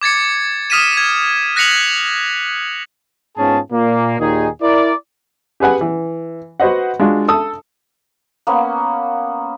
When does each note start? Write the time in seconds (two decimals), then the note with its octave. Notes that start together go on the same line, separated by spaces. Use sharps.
0.01 D6 G#6 A6 C#7
0.70 D#6 F6 B6 D#7 E7
0.97 G#6
1.56 F#6 A#6 B6 C#7 F7 F#7
3.37 G#2 B3 C#4 F4 G#4 A5
3.72 A#2 A#3
4.19 D#2 A#2 D#3 D#4 G#4
4.62 E4 A#4 D5
5.60 G4 G#4 B4 F#5 G#5
5.81 E3
6.60 F#4 B4 C5 D#5 F#5
6.99 G#3 D4 F4 F#4
7.28 A4 D#6 E6
8.47 A#3 B3 C#4